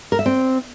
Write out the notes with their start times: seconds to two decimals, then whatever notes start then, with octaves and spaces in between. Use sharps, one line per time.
0.12 A#4
0.19 E5
0.26 C4